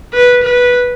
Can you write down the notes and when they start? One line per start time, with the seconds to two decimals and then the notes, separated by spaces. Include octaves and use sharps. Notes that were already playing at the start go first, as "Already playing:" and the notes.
0.14 B4
0.43 B4